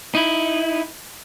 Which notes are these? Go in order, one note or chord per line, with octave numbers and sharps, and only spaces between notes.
D#4 E4